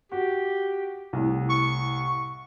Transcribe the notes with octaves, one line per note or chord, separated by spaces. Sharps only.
F#4 G4
C2 A2
C#6